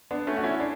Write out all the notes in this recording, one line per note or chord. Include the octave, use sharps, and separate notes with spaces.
B3 D4
A3 C#4
F#4
C#4 E4
D4